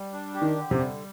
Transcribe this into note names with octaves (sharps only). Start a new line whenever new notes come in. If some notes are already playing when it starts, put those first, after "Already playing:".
Already playing: G3
D4
G4
D#3
D3
C3
G3